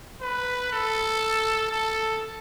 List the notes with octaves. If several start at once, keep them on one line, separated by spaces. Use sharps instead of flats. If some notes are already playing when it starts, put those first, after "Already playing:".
B4
A4
A4